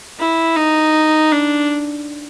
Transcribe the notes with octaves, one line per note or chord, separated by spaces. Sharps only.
E4
D#4
D4